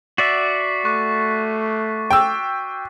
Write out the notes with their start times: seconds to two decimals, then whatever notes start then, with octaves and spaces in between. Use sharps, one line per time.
0.18 F#4 D5 E5 A6 B6 C7
0.85 A3 C#6 D6 F#6
2.11 G5 E6